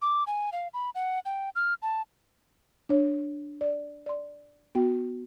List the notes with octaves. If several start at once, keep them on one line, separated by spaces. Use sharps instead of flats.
D6
G#5
F5
B5
F#5
G5
F6
A5
D4 C#5
D5
D5 C6
B3 F#4 G5